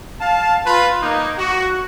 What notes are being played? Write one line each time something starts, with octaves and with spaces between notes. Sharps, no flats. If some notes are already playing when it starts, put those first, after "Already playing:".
F5 A5
F4 B4
A#3 D#4
F#4